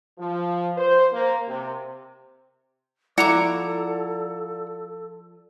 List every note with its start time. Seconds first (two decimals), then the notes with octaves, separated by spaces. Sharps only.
0.19 F3
0.77 C5
1.12 A#3
1.48 C3
3.18 F3 E4 A4 D5 F#5 A#5 D6